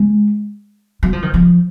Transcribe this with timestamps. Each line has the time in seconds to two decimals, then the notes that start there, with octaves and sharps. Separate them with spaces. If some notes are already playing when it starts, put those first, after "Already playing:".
Already playing: G#3
1.03 F#3
1.13 F3
1.22 D#3
1.34 F3